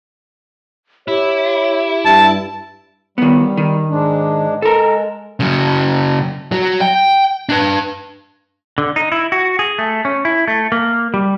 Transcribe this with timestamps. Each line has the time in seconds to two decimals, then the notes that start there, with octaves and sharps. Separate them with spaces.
1.08 E4 G4 C#5
2.05 G2 A5
3.18 D#3 G3 B3
3.57 D#3
3.90 G#2 G#3 D4
4.62 G#3 A4 A#4
5.40 C#3 F#3
6.52 F#3 F#4
6.81 G5
7.49 D4 B4
8.78 D3
8.96 D#4
9.12 E4
9.32 F#4
9.59 G#4
9.79 A3
10.05 C#4
10.25 E4
10.48 A3
10.72 A#3
11.14 G3